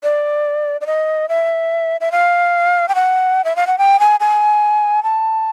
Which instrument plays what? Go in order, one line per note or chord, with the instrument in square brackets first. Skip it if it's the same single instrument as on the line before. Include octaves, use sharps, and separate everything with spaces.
[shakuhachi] D5
D5
D#5
E5
E5
F5
G5
F#5
E5
F5
F#5
G5
G#5
G#5
A5